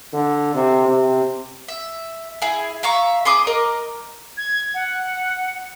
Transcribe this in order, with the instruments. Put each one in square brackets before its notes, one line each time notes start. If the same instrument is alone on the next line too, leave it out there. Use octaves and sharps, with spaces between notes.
[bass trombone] D3
C3
C3
[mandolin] E5
E4 G#4
E5 F5 A#5 C#6
G#4 C6 D6 D#6
A#4 D#5 D6
[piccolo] G#6
F#5